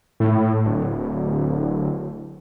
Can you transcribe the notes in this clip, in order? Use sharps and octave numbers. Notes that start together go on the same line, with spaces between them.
A2
D1